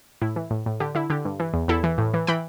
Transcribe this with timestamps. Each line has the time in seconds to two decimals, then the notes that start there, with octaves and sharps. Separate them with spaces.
0.22 A2 E4
0.36 E3
0.51 A2
0.66 A2
0.80 D3 G4
0.95 D3 E4
1.10 D3 G4
1.25 G2
1.40 E3
1.54 E2
1.68 E2 E4 A4
1.84 E3
1.98 A2
2.14 E3
2.27 E3 G5 B5